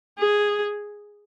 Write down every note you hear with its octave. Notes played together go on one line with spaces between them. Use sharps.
G#4